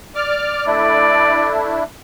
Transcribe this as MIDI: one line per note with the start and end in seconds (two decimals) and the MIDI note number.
0.15 0.65 74
0.15 0.65 86
0.15 0.65 89
0.66 1.84 57
0.66 1.84 62
0.66 1.84 64
0.66 1.57 74